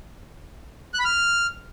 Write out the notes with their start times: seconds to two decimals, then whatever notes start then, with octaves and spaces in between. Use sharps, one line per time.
0.94 F#6
0.99 B5
1.05 F6